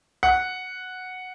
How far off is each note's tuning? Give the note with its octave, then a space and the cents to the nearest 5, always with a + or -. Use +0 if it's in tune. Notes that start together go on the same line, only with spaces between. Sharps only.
F#5 -5